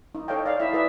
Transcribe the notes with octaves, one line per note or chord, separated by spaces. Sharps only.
D#4
A4 C#5 D#5 F5 G5
D5 F5
E4 D#5 E5
G#4 B4 D5 E5